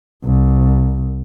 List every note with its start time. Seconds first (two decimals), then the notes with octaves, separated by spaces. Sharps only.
0.24 C2